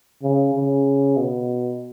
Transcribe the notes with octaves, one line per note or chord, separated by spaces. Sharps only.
C#3
C#3
B2